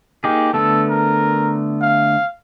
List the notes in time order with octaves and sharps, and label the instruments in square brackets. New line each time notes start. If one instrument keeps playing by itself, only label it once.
[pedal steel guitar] A#3 D#4 G#4 [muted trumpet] G4
[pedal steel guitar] D3 A3 B3 [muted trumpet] A4
[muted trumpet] A#4
F5